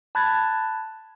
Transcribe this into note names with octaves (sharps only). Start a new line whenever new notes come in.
A5 B5 F#6 G#6 A6